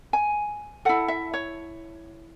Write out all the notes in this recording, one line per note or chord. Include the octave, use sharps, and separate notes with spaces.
G#5
E4 A4 F#5
E5
C#5